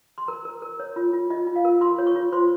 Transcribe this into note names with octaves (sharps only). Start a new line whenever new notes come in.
C6
A#4 A#5
A#4
A#4
C#5
F4
F4
F4 D#5
F4
F5
A#4
F4 C6
C#5
C#6
F4
C5 C6